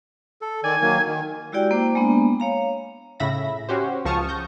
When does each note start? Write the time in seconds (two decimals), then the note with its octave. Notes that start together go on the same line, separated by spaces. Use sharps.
0.42 A4
0.64 D#3 D5 G#5
0.82 D#3 F#3 A#3
1.06 D#3
1.52 G#3 E4 F#4 G4 D5 G5
1.71 A#3 C5 D6
1.95 G#3 A#3 B3 D4
2.40 C#5 F5 A#5
3.20 A2 C#3 E5 B5 A#6
3.69 C#4 F#4 G4 C5
4.05 C#2 F3 A5 C#6 D#6 F6
4.29 G6 A#6